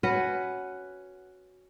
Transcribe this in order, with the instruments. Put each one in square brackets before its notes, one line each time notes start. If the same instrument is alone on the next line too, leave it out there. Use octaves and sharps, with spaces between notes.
[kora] C#4 F#4 B4 F#5